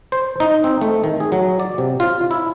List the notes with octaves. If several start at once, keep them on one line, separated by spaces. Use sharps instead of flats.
C5
D#4
C4
A3
D#3
G#4
F#3
D5
C3
F4
E4